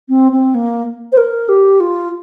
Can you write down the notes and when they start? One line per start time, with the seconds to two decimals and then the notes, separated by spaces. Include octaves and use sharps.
0.09 C4
0.32 C4
0.55 A#3
1.12 C5
1.17 A#4
1.49 G4
1.80 F4